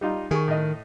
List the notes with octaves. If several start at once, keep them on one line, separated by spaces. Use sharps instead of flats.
G3 D#4 F4
D#3 G#4 C#6
A2 D#5